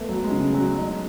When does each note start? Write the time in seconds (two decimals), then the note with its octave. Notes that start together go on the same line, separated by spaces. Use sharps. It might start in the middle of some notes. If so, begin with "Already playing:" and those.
Already playing: A3 B3
0.09 F#3
0.24 G#3
0.31 C#3
0.54 F#3
0.78 D#4